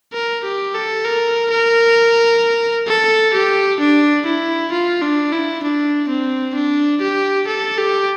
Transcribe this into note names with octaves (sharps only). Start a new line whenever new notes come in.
A#4
G4
A4
A#4
A#4
A4
G4
D4
E4
F4
D4
E4
D4
C4
D4
G4
A4
G4